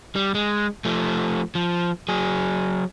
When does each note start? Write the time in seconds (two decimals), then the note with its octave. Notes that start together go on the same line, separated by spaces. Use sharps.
0.16 G3
0.35 G#3
0.85 F3 A3
1.55 F3
2.08 F#3 G#4